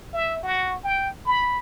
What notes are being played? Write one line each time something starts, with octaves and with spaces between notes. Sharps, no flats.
E5
F#4
G5
B5